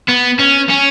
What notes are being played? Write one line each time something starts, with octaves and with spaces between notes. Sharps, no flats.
B3
C#4
C#4